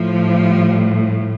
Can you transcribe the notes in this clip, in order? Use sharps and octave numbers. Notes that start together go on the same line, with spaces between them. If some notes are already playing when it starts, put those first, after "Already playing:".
Already playing: A2 F3
G3